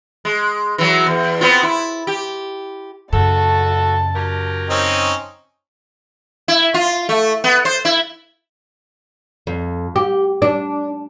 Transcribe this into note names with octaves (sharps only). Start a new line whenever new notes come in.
G#3
E3 F#3
E2
B3 C4 F4
E4
G4
F#2 C#3 A3 F#4 A4 A5
F#3 G4 A#4
C4 C#4 D#4
E4
F4
A3
B3
C5
E4
F2
G4
D4